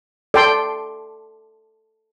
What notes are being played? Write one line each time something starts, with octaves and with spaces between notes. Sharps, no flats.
A4 D5 G5 C6